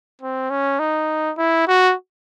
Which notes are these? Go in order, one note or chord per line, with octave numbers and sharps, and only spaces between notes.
C4
C#4
D#4
E4
F#4